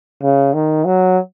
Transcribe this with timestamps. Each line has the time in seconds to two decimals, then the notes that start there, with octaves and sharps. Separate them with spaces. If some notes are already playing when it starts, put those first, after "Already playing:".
0.22 C#3
0.54 D#3
0.85 F#3